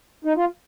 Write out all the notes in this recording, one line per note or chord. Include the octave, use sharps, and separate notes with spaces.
D#4
F4